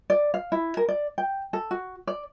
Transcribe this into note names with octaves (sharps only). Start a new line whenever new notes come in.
D5
F5
E4
A#4
D5
G5
A4
F#4
D5